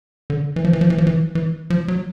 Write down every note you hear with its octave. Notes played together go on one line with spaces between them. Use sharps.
D3
E3
F3
E3
F3
E3
F3
E3
E3
F3
F#3